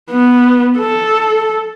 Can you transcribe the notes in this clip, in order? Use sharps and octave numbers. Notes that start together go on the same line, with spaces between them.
B3
A4